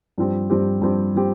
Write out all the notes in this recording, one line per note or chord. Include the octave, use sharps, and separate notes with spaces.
G2 F3 C4 G4
G2 F3 C4 G4
G2 F3 C4 G4
F3 C4 G4